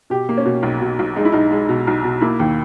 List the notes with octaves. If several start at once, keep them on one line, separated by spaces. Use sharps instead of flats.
B2 G4
A#3
C#4
B2
B1
B2
B1
G#3 D#4
E4
B1 D#4
G#3
B2
B1
B2
A#3 E4
D#2